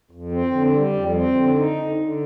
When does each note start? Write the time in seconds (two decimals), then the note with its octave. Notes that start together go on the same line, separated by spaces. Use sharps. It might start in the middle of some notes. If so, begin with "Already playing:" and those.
0.11 F2
0.31 C4
0.51 D3
0.73 G3
0.93 F2
1.13 C4
1.35 D3
1.56 D#4
1.76 D3
1.97 D3